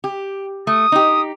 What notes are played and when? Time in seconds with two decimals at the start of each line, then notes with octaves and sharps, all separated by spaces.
0.04 G4
0.67 A3 D#6
0.92 D#4 G4